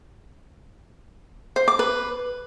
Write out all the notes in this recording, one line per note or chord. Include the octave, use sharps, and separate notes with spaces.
C5
D6
B4